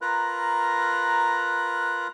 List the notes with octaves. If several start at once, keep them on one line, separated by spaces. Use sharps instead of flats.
F4 A#4 B4 A#5 F#6